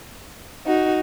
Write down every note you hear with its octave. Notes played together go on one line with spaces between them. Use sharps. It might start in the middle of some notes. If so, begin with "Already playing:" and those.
D#4 F#4